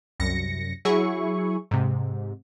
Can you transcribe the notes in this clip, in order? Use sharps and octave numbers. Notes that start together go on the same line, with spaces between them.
C2 F#2 A#6 C#7
F#3 E4 G#4 C#6
G#2 C3